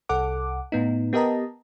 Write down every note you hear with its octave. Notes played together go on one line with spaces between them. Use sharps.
C2 A4 F#5 D6
A2 B3 D#4
B3 G4 A#4 D#5 A5 A#5